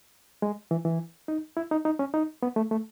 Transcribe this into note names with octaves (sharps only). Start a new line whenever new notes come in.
G#3
E3
E3
D#4
E4
D#4
D#4
C#4
D#4
B3
A3
A3